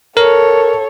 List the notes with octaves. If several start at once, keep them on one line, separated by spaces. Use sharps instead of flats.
A4 A#4 C#5